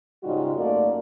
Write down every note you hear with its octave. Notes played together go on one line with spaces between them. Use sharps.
G#2 C#3 G3 D#4 F4 F#4
F#2 A3 A#3 D5